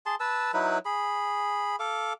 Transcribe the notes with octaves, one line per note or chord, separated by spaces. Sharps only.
G#4 A5 C6
B4 A5 E6
F#3 D#4 E4 B4
G#4 B5
A4 F5 D6